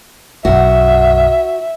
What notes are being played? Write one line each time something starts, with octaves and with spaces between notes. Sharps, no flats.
B1 F#2 F#4 E5